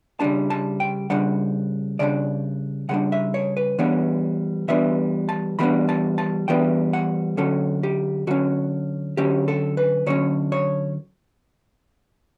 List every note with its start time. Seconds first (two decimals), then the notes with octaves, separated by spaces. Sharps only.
0.20 C#3 G3 D4 A5
0.50 A5
0.80 G5
1.10 C#3 G3 D4 F#5
1.99 C#3 G3 D4 D5
2.89 C#3 G3 D4 F#5
3.12 E5
3.34 C#5
3.57 B4
3.78 E3 G3 B3 D4 C#5
4.68 E3 G3 B3 D4 E5
5.29 A5
5.59 E3 G3 B3 D4 B5
5.89 A5
6.18 A5
6.48 E3 G3 B3 D4 G5
6.93 F#5
7.37 D3 F#3 C#4 A4
7.83 G4
8.27 D3 F#3 C#4 F#4
9.17 D3 F#3 C#4 G4
9.48 A4
9.77 B4
10.06 D3 F#3 C#4 C#5
10.52 C#5